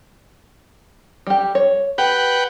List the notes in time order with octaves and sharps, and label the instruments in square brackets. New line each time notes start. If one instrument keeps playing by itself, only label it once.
[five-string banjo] G3 G4
C#5
[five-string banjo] G4 [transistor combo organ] B4 F#5 G5